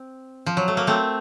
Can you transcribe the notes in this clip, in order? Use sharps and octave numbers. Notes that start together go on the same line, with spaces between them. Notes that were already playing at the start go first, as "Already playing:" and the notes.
Already playing: C4
F3
F#3
A3
A#3
A3 C4